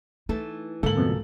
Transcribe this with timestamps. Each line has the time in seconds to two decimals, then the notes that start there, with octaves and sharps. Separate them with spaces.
0.29 E3 A3 D#4 A4
0.83 G#2 D3 A#3 F4 A4 F#7
0.96 C2 F2 B2